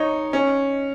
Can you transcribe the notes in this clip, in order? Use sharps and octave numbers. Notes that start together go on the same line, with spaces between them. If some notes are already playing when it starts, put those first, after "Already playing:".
Already playing: D#4 C#5
C#4